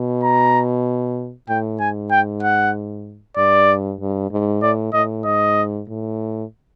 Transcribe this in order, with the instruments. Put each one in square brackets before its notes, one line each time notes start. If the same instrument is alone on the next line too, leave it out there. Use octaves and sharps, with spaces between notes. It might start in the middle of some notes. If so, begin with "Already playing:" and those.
Already playing: [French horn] B2
[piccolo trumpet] A#5
[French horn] A2 [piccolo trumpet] G5
[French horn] G#2 [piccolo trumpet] G#5
[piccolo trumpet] G5
F#5
[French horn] G2 [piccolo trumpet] D5
[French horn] G2
G#2
[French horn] A2 [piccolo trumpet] D5
[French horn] A2 [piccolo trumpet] D#5
[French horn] G#2 [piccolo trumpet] D#5
[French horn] A2